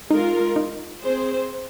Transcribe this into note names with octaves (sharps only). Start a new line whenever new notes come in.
G#3 D#4 F4 A#4
D#4
C4 G#4 C5